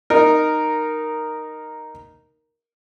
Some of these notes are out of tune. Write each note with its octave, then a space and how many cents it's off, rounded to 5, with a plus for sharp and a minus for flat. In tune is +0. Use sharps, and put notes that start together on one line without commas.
D#4 -10 A#4 +0